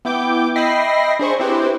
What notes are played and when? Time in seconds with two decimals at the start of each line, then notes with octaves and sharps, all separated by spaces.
0.05 B3 E4 G5 D6 G6
0.56 D#5 E5 G5 B5 A#6 C7
1.19 D4 G#4 C5 C#6
1.39 C4 E4 G4 B4 C5